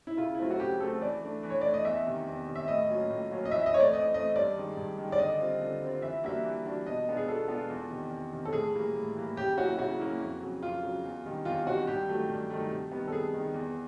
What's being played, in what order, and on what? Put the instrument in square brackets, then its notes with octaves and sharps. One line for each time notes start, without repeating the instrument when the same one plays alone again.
[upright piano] E4
[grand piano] C#3 [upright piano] F4
[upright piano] E4
[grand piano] F#3 A3 C4 [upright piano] F4
[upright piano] F#4
[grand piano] C#3 [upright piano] G4
[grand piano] F#3 A3 C4 [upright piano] A4
[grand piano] E3 [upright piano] D5
[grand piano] A3 D4
E3
[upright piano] C#5
[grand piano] A3 D4 [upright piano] D5
[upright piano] D#5
[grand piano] E2 [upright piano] E5
[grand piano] C3 D#3
E2
C3 D#3
[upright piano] E5
[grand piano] A2 [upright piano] D#5
[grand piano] F#3 A#3 C#4 F4
A2
F#3 A#3 C#4 F4
[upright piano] D#5
[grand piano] E3 [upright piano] E5
[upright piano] D#5
[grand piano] C4 [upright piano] C#5
[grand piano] A3 [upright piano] D5
[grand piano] E3 [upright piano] D#5
[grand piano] A3 C4 [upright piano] D#5
[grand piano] G2 [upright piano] D5
[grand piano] D#3 G#3
G2
D#3 G#3
[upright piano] D5
[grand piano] D3 [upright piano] D#5
[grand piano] G3 C4 F4
D3
G3 C4 F4
[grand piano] E3 [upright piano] E5
[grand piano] G3 A#3 D4 F#4 [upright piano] E5
[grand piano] E3
G3 A#3 D4 F#4
[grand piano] B2 [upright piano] D#5
[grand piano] G#3 B3 D4 F4
[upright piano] G#4
[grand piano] B2 [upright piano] A4
[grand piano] G#3 B3 D4 F4
E2
C3 D#3
E2
C3 D#3
[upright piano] A4
[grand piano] A2 [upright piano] G#4
[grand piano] E3 G3 A#3
A2
E3 G3 A#3
[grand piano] C#3 [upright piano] G4
[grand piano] F#3 A#3 C#4 E4 [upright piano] F#4
[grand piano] C#3 [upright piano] F#4
[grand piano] F#3 A#3 C#4 E4
F2
C#3 F#3
[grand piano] F2 [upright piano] F4
[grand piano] C#3 F#3
E2
C3 D#3 G3
[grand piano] E2 [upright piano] F4
[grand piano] C3 D#3 G3 [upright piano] F#4
[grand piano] G2 [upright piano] G4
[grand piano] D#3 F#3 A3
G2
D#3 F#3 A3
C3
D#3 G3 B3
[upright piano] A4
[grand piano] C3 [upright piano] G#4
[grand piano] D#3 G3 B3
E2